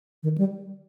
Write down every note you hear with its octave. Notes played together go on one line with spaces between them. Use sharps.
D#3
G3